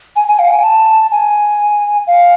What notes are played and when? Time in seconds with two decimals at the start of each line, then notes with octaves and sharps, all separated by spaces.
0.16 G#5
0.28 G#5
0.39 F5
0.51 G#5
0.64 A5
1.12 G#5
2.07 F5